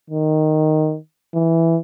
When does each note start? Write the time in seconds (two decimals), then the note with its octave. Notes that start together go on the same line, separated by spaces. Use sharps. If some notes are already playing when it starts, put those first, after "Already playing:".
0.10 D#3
1.34 E3